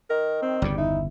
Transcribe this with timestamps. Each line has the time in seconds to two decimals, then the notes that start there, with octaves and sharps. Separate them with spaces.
0.10 D#3 A#4
0.42 C4
0.62 G1 E2 C#3 G3
0.78 D#4 E4